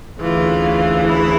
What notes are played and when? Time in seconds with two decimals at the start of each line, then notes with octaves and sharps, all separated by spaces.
0.21 D2 C#3 E3 F4
1.07 E4